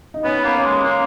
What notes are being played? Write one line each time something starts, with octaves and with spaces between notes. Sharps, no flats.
D#4
B3 C#4
A#3
C#4
G#3
A#3 C#4